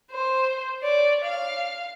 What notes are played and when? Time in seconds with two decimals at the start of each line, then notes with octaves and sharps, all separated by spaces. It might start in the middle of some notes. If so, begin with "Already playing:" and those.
0.11 C5
0.82 C#5 D5
1.25 F5